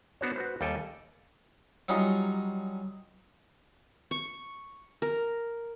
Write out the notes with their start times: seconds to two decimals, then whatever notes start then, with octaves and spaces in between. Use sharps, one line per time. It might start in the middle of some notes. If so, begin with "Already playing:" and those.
0.21 B3 D4 F#4 C5 C#5
0.36 F#4 B4 C5
0.61 D#2 G3 A4 G5 G#5
1.89 F#3 G3 C#4 D#4 F4
4.11 C#6
5.02 A#4